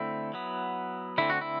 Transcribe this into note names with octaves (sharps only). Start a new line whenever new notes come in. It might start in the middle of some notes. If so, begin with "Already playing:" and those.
Already playing: D3 A3 C4 E4
F#3 B3
D3 A3 C4 E4
F#4
E4